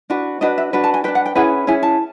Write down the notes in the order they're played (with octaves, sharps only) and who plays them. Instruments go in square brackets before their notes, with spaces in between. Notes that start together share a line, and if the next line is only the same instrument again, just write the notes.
[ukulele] D4 F#4 B4
D4 F#4 B4 D#5
E5
D4 F#4 B4
A5
G#5
D4 F#4 B4 G5
F#5
G5
C#4 E4 G#4 B4 F#5
C#4 E4 G#4 G#5
A5